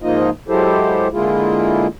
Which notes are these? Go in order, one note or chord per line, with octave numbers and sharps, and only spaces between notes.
G#2 F3 A#3 D#4 F4 D#5
F#3 G#3 E4 G4 A4 C5
D3 G#3 A#3 E4 F4 G#4